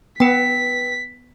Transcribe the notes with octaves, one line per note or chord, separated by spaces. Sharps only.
B3 B4 G5 B6